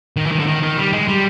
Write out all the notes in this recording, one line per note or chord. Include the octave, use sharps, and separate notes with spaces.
D#3
E3
D#3
D3
D#3
D#3
G3
G#3
G3